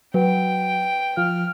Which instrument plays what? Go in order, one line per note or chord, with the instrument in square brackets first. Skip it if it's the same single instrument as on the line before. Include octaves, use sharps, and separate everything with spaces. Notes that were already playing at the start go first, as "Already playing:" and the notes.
[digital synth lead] F#3 [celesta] B4 [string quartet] G5
[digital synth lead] F3 [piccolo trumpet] F6